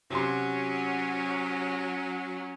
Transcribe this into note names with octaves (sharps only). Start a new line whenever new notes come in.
C3 F#3 C#4 C6